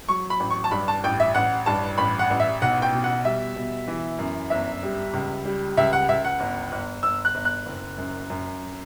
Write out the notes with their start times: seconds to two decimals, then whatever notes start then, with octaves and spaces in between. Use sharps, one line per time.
0.09 F#3 C#6
0.30 B5
0.40 A1
0.51 C#6
0.64 A5
0.71 G2 B5
0.88 A5
1.04 A1 G5
1.20 E5
1.35 A1 F#5
1.66 G2 A5
1.98 A1 B5
2.19 F#5
2.30 A1
2.40 E5
2.62 B1 F#5
2.82 G5
2.93 B2
3.04 F#5
3.25 G3 E5
3.56 B2
3.88 E3
4.19 F#2
4.50 G1 E5
4.83 G3
5.13 C#2
5.45 G3
5.77 C#2 E5
5.93 F#5
6.09 C#2 E5
6.25 F#5
6.40 G1
6.72 G1
7.03 G1 E6
7.25 F#6
7.35 G1
7.45 F#6
7.66 F#1
7.98 F#2
8.30 F#2